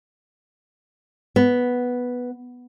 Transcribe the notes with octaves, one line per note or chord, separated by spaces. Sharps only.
B3